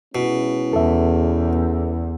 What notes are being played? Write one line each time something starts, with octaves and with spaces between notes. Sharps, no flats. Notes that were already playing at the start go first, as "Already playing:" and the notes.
B2 G#3 C#4 E4
E2 A4 E5